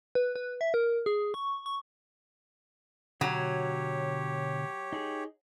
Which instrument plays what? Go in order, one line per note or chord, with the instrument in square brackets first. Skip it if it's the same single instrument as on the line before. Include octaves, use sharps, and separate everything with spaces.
[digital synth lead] B4
B4
E5
A#4
G#4
C#6
C#6
[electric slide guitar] B2 D3 F#4 [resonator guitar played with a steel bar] F#3 [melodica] G4 C#5
[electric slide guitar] D#4 G#4